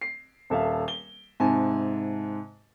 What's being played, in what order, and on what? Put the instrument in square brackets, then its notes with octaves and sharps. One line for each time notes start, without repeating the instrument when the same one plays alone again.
[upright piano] C7
D#1 A4 E5 F5
G7
G#2 C3 G#5 A5